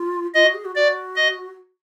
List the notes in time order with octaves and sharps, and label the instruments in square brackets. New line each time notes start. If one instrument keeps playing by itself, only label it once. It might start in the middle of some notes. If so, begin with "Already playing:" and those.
Already playing: [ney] F4
[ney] F4 [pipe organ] D#5
[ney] F#4
G#4
F#4
[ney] F#4 [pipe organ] D5
[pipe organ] D#5